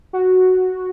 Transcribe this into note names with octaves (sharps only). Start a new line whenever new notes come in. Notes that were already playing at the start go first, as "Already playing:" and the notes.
F#4